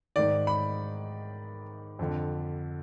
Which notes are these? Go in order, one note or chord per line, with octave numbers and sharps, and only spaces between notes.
G#2 D#3 D5
B5
F2 D3